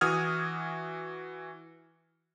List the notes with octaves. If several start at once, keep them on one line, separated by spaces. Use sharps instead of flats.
E3 F#4 D#6 F6 G#6